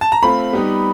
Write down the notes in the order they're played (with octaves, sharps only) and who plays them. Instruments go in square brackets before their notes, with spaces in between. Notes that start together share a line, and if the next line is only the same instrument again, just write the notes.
[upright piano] A5
A#5
[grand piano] A3 C4 F4 [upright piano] B5
[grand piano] G3 B3 D#4 G4